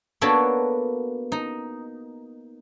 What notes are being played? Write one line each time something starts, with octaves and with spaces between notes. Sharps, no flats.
A#3 B3 D4 F#4 A4 C#5
D#4